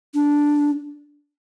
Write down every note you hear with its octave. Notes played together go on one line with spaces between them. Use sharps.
D4